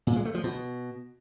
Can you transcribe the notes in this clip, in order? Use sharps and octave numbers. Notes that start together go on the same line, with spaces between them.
A#2
G#3
A3
F3
B2